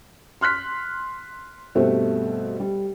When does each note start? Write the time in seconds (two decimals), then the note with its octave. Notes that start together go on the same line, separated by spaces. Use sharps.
0.41 C6 F6 F#6 B6
1.75 G2 B2 A3 C4
2.60 G3